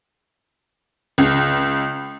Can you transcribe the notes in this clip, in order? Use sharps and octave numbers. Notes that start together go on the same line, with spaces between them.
C#2